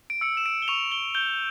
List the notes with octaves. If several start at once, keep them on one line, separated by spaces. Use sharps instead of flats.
D7
E6 C#7
E7
D7
G7
C#6 F7
G7
G6 G7